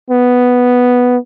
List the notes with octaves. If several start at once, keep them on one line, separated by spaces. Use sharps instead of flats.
B3